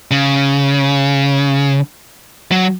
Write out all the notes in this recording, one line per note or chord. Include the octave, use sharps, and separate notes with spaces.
C#3
F#3